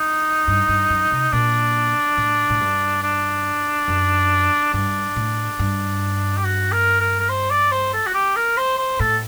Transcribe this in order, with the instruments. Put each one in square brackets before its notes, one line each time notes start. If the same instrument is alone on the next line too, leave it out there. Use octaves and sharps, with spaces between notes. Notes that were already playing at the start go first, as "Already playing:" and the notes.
Already playing: [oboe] D#4
[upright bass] G2
G2
F#2
C3
[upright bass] A#2 [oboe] D4
[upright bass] A2
A2
G2
[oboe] D4
[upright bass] F#2
[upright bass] G2 [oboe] D4
[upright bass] A2
G2
[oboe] G4
F#4
A#4
A#4
A#4
C5
D5
C5
A4
F#4
G4
A#4
C5
C5
[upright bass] A2 [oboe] A4